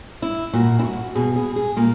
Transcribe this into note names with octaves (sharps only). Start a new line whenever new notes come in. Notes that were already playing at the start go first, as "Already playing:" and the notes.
E4
A#2 F#4
E4
F#4
B2 G#4
G#4
G#4
A#2 A#3